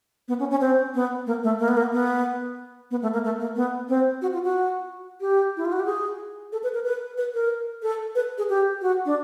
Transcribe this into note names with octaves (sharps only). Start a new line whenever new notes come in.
B3
C#4
C#4
C4
B3
A#3
A3
A#3
B3
A#3
B3
B3
A3
A#3
A3
A#3
B3
C4
F#4
F4
F#4
G4
E4
F4
F#4
G4
G#4
A4
B4
A#4
B4
B4
A#4
A4
B4
G#4
G4
F#4
D4